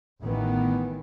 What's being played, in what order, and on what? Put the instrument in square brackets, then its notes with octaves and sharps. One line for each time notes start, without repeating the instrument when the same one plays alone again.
[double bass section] A1 D#3 E3 B3